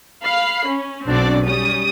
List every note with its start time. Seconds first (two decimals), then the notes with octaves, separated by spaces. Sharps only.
0.23 F5 B5 C7
0.66 C#4
1.06 B1 F#2 C4 D4 F#4 D5
1.45 G3 C#4 D#6